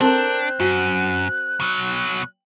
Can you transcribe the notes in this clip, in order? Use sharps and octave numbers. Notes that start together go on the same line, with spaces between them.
C4 D4 A4 A#4 G5 F#6
F#2 F#4
B2 F#3